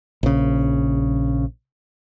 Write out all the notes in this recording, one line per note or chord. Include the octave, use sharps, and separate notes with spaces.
A#1 C#3